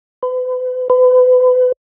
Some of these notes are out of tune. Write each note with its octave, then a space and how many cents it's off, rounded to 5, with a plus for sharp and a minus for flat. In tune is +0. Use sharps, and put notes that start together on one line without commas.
B4 +40
B4 +35